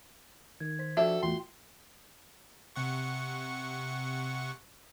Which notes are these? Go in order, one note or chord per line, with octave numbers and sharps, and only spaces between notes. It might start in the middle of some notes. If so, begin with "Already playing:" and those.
D#3 G#6
C5 B6
F3 D4 F#4 A4 D5 E5 G5
E2 A2 F4 G5 C6
C3 F#5 C#6